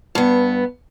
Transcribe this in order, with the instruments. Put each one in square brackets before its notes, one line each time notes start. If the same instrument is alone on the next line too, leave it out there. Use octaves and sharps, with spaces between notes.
[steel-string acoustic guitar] G2 B3